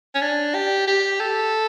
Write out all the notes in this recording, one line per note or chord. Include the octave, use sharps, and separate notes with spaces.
C#4
D4
G4
G4
A4